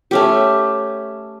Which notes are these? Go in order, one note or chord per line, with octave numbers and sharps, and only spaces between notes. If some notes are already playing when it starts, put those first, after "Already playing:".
A3 C#4 G4